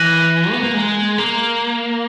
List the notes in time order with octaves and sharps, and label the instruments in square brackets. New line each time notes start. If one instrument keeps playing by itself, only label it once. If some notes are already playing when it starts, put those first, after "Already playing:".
Already playing: [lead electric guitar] E3 [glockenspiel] F#6 A#6 D#7 F#7
[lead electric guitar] B3
A#3
G#3
A#3